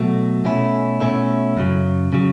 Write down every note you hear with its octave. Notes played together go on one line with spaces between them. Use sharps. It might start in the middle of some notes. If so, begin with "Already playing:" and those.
Already playing: B2 F#3 A3
B2 A3 C#4 E4
B2 A3 C#4 E4
F#2 C#3 F#3
C#3 F#3